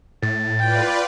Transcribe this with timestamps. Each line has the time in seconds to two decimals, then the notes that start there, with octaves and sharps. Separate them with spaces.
0.22 A2 A6
0.59 F4 B4 D5 G5